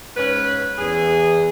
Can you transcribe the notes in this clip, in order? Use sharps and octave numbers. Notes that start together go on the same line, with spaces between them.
G#2 C#4 B4
E2 G#4